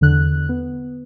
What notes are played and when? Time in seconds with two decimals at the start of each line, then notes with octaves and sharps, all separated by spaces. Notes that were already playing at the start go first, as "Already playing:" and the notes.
0.01 E2 D3 F#6
0.49 B3